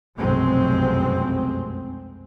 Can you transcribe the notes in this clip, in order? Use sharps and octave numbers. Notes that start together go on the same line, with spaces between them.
F1 B1 F#2 G#3 C4